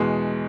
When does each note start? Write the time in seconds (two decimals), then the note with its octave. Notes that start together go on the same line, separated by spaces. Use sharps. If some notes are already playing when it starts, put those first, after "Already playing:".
Already playing: E2 B2 G#3